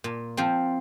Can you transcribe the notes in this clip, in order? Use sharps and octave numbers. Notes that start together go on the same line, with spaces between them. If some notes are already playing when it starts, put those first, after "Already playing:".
A#2
F3 C4